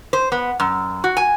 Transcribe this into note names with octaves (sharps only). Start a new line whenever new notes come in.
C5
B3
F#2
F#4
G#5